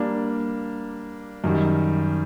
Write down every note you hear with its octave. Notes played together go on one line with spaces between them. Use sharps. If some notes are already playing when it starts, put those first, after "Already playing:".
Already playing: G3 A#3 D4
F#2 D#3 G3